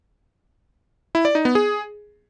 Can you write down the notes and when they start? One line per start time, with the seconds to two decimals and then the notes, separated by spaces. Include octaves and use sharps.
1.15 E4
1.25 D5
1.35 D#4
1.45 B3
1.55 G#4